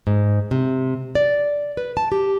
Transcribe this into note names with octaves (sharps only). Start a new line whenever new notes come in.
G#2
C3
D5
B4
A5
G4